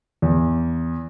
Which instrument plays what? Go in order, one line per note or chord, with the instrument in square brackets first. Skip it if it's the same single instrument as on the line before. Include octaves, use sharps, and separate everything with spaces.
[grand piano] E2